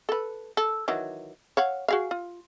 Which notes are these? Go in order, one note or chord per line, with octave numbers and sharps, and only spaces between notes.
A4 B4
A4
D#3 E3 F#3
C#5 F5 F#5
F#4 G#4 F5
F4